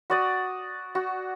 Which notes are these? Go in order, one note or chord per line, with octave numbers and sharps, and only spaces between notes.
F#4 D5 D#6
F#4